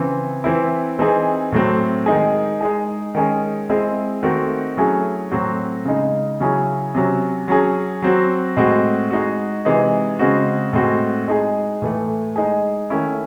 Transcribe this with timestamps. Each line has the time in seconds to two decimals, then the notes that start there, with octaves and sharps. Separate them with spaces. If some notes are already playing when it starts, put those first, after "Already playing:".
Already playing: C#3 E3 C4
0.44 E3 C4 E4
0.99 E3 C4 D#4 G#4
1.52 A2 F#3 A3 C4
2.06 D#3 G#3 D#4 G#4
2.61 G#3 D#4 G#4
3.15 D#3 G#3 C#4 G#4
3.70 G#3 C4 E4 G#4
4.23 D#3 A3 C4 F#4
4.77 F#3 A3 C#4 E4 G#4
5.32 A2 F#3 C4 F#4
5.85 C#3 G#3 D#4
6.40 C#3 F#3 C#4 E4 G#4
6.95 C3 F#3 C#4
7.48 F#3 C#4 G#4
8.02 F#3 C4 F#4
8.57 A2 G#3 C4 F#4
9.11 G#3 D#4 F#4
9.65 C3 E3 G#3 D#4
10.19 C#3 G#3 C4 F#4
10.73 A2 G#3 C4 F#4
11.28 G#3 D#4 G#4
11.82 A2 E3 A3
12.36 G#3 D#4 G#4
12.90 D#3 A3 C#4 E4